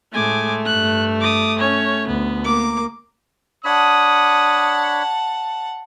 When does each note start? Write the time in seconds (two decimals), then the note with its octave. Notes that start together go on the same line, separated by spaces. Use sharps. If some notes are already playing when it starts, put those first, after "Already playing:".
0.13 A2 G#3 A3 G#5 D6
0.65 G2 F#6
1.20 D6 D#6
1.59 C#4 C#5
2.07 D2 B3
2.45 A#3 D6
3.65 D4 C#5 F#5 A5 B5 D#6